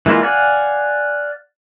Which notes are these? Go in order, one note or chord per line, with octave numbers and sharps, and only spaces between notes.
E3 G#3 A#3 E4 F4
D5 F5 F#5 G#5